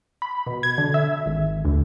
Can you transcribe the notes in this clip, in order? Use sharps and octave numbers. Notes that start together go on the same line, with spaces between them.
B5
B2
G#6
D3
E5
G#1
D2